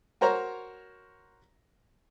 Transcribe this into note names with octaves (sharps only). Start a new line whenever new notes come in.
F#4 A#4 C5 C#5 A#5